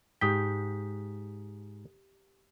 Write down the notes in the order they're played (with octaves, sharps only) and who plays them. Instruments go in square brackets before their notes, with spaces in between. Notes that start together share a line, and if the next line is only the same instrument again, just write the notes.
[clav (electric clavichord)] G#2 G5 [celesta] G4 D#6 B6